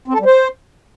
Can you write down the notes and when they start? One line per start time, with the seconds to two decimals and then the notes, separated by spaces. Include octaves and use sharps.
0.08 C4
0.14 A4
0.20 G3
0.26 C5